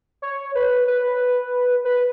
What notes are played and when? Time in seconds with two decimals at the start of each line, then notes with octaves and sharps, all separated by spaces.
0.22 C#5
0.55 B4
0.87 B4
1.85 B4